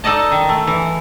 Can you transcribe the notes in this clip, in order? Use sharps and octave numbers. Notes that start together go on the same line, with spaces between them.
D#4 A4 D5 D#5 A5
D#3
A3
E3